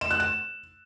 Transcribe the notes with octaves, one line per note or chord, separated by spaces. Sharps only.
E7
F#6
E7